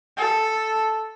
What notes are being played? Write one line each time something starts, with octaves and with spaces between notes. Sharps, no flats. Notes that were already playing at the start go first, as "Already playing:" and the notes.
A4